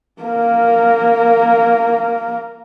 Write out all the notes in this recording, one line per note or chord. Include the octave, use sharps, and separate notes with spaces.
A#3 A#4